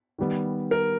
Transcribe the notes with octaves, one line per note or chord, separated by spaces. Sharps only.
D#3 G3 B3
A#4